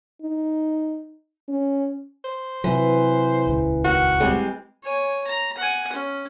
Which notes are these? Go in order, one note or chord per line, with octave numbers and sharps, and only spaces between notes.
D#4
C#4
C5
C3 E3 F#3
D#1 C#2 C#3
D#3 F#4
G3 G#3 C4
C#5 G#5
A#5
F#5 G#5
C#4